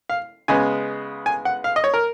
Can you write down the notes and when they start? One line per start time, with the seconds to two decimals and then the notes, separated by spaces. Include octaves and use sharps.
0.09 F5
0.48 C#3 G#3 B3 G#5
1.26 G#5
1.45 F#5
1.64 F5
1.76 D#5
1.84 C#5
1.94 A#4